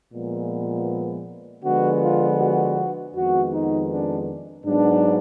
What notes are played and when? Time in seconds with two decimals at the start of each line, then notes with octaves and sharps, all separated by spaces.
0.13 A#2 F3 G#3 B3
1.64 D3 F3 G#3 B3 F#4
2.03 F4
2.40 F#4
3.15 F2 D#3 G#3 B3 F#4
3.53 D#4
3.92 D4
4.66 G#2 F#3 B3 D4